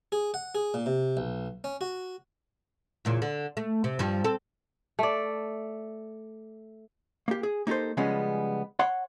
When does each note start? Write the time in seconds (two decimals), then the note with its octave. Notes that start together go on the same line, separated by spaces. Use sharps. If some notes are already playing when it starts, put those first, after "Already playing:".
0.12 G#4
0.34 F#5
0.55 G#4
0.74 A#2
0.86 C3
1.17 B1
1.64 C#4
1.81 F#4
3.05 E2 A#2 C#3
3.22 D3
3.57 A3
3.84 C3
3.99 G2 F3 G3
4.24 C4 A4
4.99 A3 D5
7.28 A#3 G4
7.43 G#4
7.67 A#3 D#4 G4 A4 C5
7.97 C#3 F3 G3 G#3 B3 C#4
8.79 C#5 F#5 C6